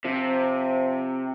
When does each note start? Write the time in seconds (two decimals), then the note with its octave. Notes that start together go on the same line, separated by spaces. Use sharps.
0.05 C3 F3